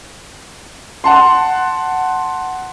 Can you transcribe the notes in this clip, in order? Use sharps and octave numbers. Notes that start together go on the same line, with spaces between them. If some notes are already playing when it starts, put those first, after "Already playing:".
F#5 A5 C6